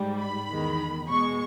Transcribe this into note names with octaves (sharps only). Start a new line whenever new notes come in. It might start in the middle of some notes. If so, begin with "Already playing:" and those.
Already playing: G#2 G3
B5
E2 D#3 G#3
B2 G#3 C#6